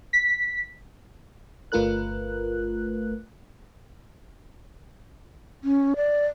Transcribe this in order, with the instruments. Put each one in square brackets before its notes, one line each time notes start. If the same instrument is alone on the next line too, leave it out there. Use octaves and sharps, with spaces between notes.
[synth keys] B6
[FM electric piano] G1 A3 F4 A#4 B4 F#6
[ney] C#4
D5